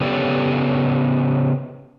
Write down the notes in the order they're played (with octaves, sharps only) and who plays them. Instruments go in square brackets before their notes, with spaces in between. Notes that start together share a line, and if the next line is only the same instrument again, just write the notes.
[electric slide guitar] C#3 B3 G4 A4 C#5 D5